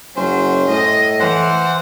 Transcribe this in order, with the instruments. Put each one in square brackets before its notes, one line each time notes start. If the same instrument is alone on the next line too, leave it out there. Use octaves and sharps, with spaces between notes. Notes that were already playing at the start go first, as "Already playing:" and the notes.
[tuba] F#1 [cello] F#3 [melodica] C#4 C5
[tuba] A2 [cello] D#5
[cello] E3 [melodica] C5 F#5